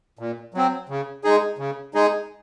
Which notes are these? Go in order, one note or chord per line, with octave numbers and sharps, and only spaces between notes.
A#2
F#3 C4
C#3
G#3 D#4 G#4
C#3
G#3 D#4 G#4